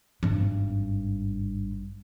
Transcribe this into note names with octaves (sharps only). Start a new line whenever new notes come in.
G#1 G2